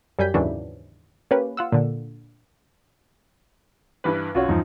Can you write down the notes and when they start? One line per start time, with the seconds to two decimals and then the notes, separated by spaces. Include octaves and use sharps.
0.19 F#2 G3 G#5 G6 B6
0.34 D#2 G#2 C#3 E3 F#3 D4
1.31 A#3 C#4 G4 B4
1.57 F4 F#5 E6
1.72 A#2 D3
4.04 G2 E3 B4
4.35 B1 F#2 F4 F#4 C#5
4.49 E2 G2 F3 D#4